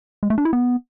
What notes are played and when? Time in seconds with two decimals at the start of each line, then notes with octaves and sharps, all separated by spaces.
0.23 G#3
0.30 A3
0.38 D4
0.45 E4
0.53 B3